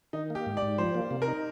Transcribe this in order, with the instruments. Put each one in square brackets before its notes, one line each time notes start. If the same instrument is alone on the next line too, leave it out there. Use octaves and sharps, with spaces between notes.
[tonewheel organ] D#3 [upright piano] D#4
[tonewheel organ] A#3
[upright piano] G4
[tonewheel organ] G#2
[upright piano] D5
[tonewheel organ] G#2
[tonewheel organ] F3 [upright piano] C5
[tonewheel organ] A#3
C3
[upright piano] A#4
[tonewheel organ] D#4